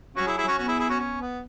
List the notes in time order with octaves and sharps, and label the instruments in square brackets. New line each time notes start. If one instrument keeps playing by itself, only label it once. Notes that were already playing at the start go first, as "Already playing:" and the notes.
[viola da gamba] F#3 [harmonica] C#4 F#4
[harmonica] E4 G#4
E4 G#4
C#4 F#4
[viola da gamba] B3 [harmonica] C#4 F#4
[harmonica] E4 G#4
E4 G#4
C#4 F#4
C#4
B3